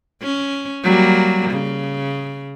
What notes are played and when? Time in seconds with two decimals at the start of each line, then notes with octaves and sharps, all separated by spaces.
0.22 C#4
0.84 F#3 G3 A#3
1.51 C#3